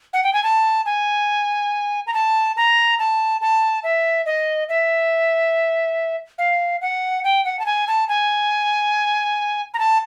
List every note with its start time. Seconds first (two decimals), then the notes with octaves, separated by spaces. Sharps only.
0.13 F#5
0.24 G5
0.33 G#5
0.43 A5
0.86 G#5
2.07 A#5
2.14 A5
2.57 A#5
2.99 A5
3.41 A5
3.84 E5
4.26 D#5
4.69 E5
6.38 F5
6.81 F#5
7.24 G5
7.45 F#5
7.59 A5
7.66 G#5
7.88 A5
8.09 G#5
9.74 A#5
9.79 A5